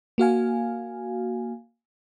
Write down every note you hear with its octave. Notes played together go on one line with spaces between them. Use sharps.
A#3 F#4 F5 G#5